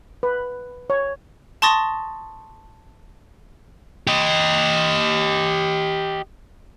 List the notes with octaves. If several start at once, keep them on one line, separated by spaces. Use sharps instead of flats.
B4
C#5
A5 C6 C#6 D#6 A6 A#6
G4 D#5